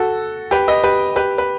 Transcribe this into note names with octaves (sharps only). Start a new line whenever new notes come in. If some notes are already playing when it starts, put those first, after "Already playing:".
Already playing: F#4 A4
G4 B4
B4 D#5
G4 B4
G4 B4
B4